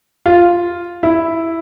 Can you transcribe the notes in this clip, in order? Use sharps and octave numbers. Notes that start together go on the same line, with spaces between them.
F4
E4